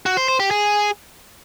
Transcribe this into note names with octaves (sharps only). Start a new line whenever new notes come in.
F#4
C5
C5
G4
G#4